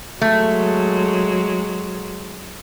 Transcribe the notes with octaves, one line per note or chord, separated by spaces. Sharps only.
F#3 G#3 A3